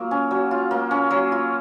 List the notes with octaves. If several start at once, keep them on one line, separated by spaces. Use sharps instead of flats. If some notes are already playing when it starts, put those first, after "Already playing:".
Already playing: F#3 A#3 F4
C#4
F#3
F4
A#3
C#4
F#3
F4